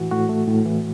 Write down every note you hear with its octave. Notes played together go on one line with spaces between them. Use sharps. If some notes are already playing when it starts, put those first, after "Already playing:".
Already playing: A2 E3 F#4
A2 F#4
A3
A2
E3